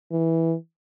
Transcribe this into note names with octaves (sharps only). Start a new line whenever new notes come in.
E3